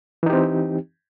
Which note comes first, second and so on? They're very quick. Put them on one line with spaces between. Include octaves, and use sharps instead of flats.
E3 D#4 G4 C4